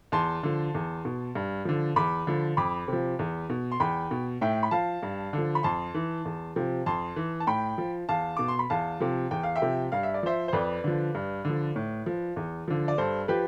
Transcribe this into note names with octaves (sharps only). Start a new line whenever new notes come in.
E2 A5 C6
D3 F3
E2
B2
G2
D3 F3
E2 B5 D6
D3 F3
F2 B5 D6
C3 F3
E2
B2
C6
E2 G5 B5
B2
A2 E5 G5
B5
F3 F5 A5
G2
D3
F3
B5
F2 A5 C6
E3
E2
C3 F3
F2 A5 C6
E3
A5
A2 G5 B5
F3
E2 F5 A5
B2 D6
C6
B5
E2 F5 A5
C3 F3
E2 G5
F5
E5 G5
C3 F3
G2 F5
E5
D5
F3 C5 E5
C5
F2 B4 D5
D3 F3
G2
D3 F3
A2
F3
E2
D3 F3
D5
G2 A4 C5
F3 G4 B4